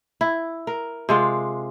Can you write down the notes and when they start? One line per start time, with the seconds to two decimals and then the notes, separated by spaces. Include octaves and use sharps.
0.21 E4
0.67 A#4
1.09 C3 G#3 F4